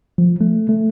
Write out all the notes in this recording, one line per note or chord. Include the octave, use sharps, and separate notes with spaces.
F3
A3
A3